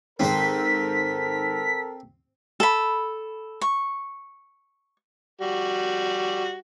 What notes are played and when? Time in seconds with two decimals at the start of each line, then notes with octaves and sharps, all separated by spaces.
0.20 G#2 D#3 C4 A4 A#4 C5 B6
2.60 A4 B5
3.61 C#6
5.41 G3 F#4